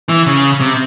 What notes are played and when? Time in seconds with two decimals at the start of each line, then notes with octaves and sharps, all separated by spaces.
0.09 E3
0.26 C#3
0.60 C3